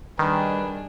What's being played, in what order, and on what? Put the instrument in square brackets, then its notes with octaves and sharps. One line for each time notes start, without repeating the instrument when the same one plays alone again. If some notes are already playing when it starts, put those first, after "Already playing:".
[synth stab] D#3 [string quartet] G3 D4 G#4 [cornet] B4